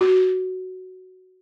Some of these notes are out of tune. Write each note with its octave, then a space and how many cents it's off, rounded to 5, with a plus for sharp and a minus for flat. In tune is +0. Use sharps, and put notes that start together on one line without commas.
F#4 +5